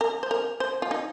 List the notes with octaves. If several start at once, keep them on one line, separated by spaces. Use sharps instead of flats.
A#4
C5
A#4
C5
F4
D#4